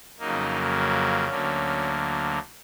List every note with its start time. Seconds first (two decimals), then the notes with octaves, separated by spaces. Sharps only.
0.19 F2 C#3 F#3 A#3 D#4
0.74 C#4
1.29 D2 D3 F#3 A#3